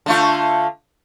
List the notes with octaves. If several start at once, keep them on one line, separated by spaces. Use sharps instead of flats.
D3 A3 F4